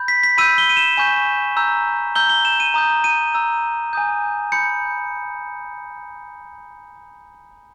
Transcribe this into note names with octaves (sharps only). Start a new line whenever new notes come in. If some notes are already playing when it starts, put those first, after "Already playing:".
Already playing: B5 G6
B6
B6
B5 E6 G6 D#7
G7
D#7
E7
G#5 C#6 G6
A#5 E6 G6
A#5 E6 G6 G7
G7
E7
D#7
A#5 D#6 G6
D#7
A#5 E6 G6
G#5 D#6 G6
B5 G6 C#7